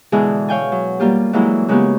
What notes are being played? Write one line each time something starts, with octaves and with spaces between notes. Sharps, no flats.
B2 D3 E3 G#3 G#4
C#5 F5 G5 G#5
F#3
G3 A#3 F4 G4
E3 F#3 G#3 A#3 E4
C#3 G#3 A#3 B3 F#4 G4